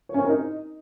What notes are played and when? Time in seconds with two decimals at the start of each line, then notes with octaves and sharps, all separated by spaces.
0.09 C#5
0.14 C#4
0.19 C4
0.25 A#4
0.30 D#4